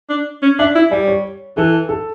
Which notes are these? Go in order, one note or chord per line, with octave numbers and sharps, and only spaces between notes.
D4
C#4
D4 E5
E4
G3 D5
C#5
E3 A4
A4